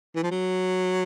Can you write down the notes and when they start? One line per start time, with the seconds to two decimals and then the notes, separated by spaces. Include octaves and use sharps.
0.15 E3
0.23 F3
0.31 F#3